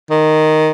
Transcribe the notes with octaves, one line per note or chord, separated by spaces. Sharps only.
D#3